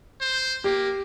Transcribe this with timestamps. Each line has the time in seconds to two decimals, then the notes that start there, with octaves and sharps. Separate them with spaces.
0.20 C5
0.64 A#3 G4